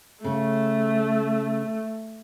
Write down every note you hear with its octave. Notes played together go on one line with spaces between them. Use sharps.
C#3 A3